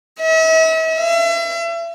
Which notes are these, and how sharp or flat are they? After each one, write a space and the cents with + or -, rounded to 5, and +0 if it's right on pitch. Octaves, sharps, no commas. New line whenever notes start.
E5 -40
E5 +40